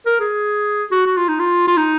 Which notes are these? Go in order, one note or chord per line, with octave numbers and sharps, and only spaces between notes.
A#4
G#4
F#4
F#4
F4
D#4
F4
F4
D#4